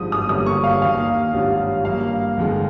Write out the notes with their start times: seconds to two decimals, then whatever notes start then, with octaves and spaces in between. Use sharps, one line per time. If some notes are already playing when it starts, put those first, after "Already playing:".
Already playing: G#1 G2 F3 G#3 D#6
0.12 D#6
0.29 G1 G2 G3 A#3 C#4 D#6
0.46 C#6
0.64 F5
0.82 D#2 D#3 A#3 F5
1.33 G#1 G2 G3 C#4 F4
1.85 G2 G3 A#3 F5
2.37 G1 F2 D#3 G#3